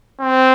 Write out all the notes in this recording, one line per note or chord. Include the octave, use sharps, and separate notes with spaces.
C4